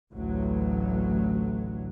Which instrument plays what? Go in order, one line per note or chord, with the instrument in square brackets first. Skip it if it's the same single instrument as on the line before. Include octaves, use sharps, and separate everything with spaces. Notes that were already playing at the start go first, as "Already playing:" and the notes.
[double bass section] A1 D2 F#3